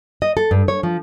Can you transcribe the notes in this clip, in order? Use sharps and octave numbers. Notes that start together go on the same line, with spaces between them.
D#5
A4
G2
C#5
F3